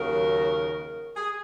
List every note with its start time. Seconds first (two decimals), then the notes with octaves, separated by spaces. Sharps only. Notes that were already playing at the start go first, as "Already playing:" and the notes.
Already playing: D#2 C#3 F#3 A#4
1.17 G#4